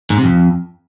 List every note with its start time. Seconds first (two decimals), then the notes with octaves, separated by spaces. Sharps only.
0.10 G#2
0.17 C3
0.24 F2